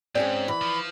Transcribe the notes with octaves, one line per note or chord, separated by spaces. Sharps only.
G#2 C4 C#4 G#4 D5
E3 B5
F3